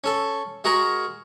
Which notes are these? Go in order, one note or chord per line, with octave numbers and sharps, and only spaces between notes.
C#4 A4
G#3 F#4 G#4 A#4